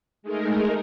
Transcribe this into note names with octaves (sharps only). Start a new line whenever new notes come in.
G#3 A3 D#4 G#4 A#4